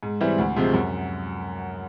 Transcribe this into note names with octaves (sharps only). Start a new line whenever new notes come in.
G#2
E3 G3 C4 E4
D2
C3 F3 G#3 C4
F#2